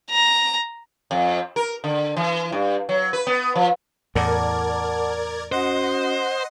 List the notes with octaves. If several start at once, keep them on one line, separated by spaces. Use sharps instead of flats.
A#5
F2
A#4
D3
E3
G2
F#3
B4
B3
F3
E2 A2 A#4 D5 F#5 A5 D6 G#6
C#4 F#4 C5 D#5 F#5 C6